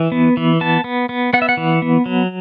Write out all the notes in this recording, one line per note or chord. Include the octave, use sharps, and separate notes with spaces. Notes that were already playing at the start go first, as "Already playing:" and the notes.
Already playing: E3
B3
E3
B3 A5
B3
B3
B3 F#5
E5
F#5
E3
B3
F#3